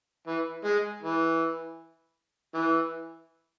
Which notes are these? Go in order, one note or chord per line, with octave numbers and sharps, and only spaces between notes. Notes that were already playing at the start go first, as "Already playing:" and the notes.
E3
G#3
E3
E3